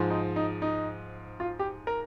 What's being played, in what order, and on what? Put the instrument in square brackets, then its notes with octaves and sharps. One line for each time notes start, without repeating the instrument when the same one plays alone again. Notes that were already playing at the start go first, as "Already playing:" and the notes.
Already playing: [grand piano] G#2 F3
D#4
D#4
D#4
F4
G4
A#4